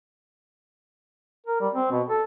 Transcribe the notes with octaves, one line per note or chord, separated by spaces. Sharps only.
A#4
G3
C4
B2
A4